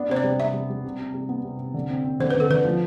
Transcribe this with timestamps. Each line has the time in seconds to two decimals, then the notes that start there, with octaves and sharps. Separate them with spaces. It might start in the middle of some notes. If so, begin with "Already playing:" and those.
Already playing: B3 D4
0.09 C3 C5
0.17 D5
0.24 G3
0.39 C3 E5
0.54 G3
0.70 G3
0.84 C3
0.99 C3
1.14 G3
1.29 B3
1.44 C3
1.59 C3
1.74 D3
1.90 C4
2.05 C4
2.20 D3 C5
2.30 D3 B4
2.40 A4
2.50 D3 B4
2.65 F3